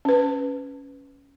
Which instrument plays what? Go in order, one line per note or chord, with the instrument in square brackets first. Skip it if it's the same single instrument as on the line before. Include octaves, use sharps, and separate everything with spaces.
[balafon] C#4 B4